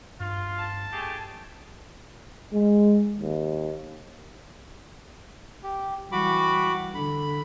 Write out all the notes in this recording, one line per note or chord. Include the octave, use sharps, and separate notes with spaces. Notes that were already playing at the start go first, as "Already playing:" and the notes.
G2 F4
A5
A3 G4 G#4
G#3
D#2
G4
E3 G3 F#4 B5 D6
D3 B5